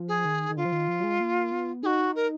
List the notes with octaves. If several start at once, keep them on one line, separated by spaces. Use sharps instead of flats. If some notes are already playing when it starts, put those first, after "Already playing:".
Already playing: F3
G#4
D#3
D#3
D3 F4
F3
D#3
F3
F#3
G#3
A#3
B3
D#4 F#4 G#4
A#4